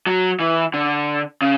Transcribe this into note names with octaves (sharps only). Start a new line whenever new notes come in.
F#3
E3
D3
C#3